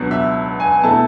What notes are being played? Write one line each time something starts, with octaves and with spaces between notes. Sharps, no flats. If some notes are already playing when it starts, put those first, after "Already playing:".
Already playing: C#2 B2 F#3 B3 D4
E5
G#5
B2 A3 E4 A5